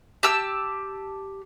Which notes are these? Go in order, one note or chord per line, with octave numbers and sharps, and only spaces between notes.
G4 A5 E6